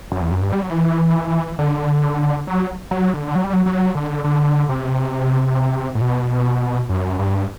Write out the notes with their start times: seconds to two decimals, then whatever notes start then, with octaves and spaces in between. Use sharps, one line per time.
0.12 F#2
0.21 E2
0.31 F#2
0.41 G2
0.52 G3
0.62 F#3
0.70 E3
1.59 D3
2.47 F#3
2.91 F#3
3.14 D3
3.35 F#3
3.44 G3
3.53 F#3
3.66 F#3
3.95 D3
4.24 D3
4.69 C3
5.95 A2
6.01 B2
6.89 F#2
7.19 G2